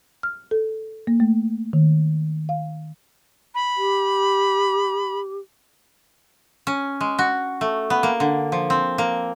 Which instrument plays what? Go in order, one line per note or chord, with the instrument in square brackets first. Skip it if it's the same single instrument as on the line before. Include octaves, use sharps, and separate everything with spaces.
[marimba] F6
A4
A#3
A3
D#3
F5
[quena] B5
[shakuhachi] G4
[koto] C#4
G#3
F#4
A3
B3
A#3
D3
F3
C4
A#3